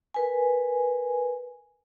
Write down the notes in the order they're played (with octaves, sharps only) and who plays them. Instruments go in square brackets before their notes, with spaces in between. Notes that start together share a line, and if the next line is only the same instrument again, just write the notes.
[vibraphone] A#4 B4 G#5